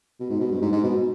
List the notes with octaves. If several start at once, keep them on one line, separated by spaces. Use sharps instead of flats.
B2
G#2
B2
G2
G#2
G#2
B2